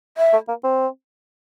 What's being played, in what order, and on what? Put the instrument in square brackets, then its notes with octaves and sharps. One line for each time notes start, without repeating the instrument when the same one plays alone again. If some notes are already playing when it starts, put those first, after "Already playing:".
[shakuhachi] E5
[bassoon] A3
A#3
C4